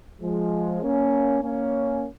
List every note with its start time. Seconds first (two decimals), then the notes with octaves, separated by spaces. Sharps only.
0.22 F3 G#3
0.82 A#3 C#4
1.42 A#3 C#4